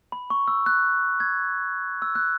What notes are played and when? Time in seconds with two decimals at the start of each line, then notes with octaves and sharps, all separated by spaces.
0.12 B5
0.30 C#6
0.48 E6
0.66 F#6
1.20 G#6
2.02 E6
2.15 F#6